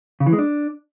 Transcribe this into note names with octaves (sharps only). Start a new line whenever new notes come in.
C#3
E3
G#3
D4